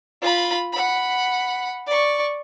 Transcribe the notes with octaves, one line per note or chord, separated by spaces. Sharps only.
F4 B5
F#5 B5
D5 C#6